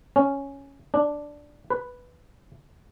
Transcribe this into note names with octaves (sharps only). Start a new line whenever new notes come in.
C#4
D4
B4